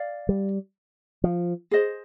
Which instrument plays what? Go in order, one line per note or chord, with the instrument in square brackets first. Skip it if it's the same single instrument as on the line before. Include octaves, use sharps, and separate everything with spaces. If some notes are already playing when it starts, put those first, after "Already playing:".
Already playing: [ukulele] D5 F5
[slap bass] G3
F3
[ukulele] G#4 C5 D#5